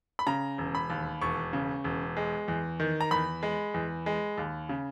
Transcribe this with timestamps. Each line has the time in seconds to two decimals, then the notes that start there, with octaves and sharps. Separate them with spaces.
0.19 B5
0.27 C#3 A#5
0.58 E1
0.75 B5
0.90 D#2
1.21 E1 C#6
1.53 C#3
1.84 E1
2.17 G#3
2.48 E2
2.80 D#3
3.01 A#5
3.11 E2 B5
3.43 G#3
3.74 E2
4.06 G#3
4.38 D#2
4.69 C#3